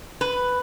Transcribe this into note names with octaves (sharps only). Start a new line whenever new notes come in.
B4